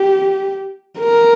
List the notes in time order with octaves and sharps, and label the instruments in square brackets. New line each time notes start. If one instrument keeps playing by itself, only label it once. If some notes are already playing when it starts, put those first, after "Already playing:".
Already playing: [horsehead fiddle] G4
A#4